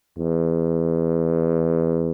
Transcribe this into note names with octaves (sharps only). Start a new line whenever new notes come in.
E2